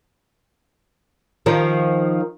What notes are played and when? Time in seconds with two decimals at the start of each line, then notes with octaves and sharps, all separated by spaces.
1.46 D#3 F3